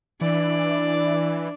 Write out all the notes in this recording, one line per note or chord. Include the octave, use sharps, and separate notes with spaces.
E3 D4 D5